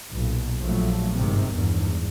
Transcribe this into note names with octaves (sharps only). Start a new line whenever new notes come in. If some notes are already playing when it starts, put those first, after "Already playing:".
B1 A#2
A#1 F3 F#3 A3
G1 G#2 C3 D#3
G1 E2 G#2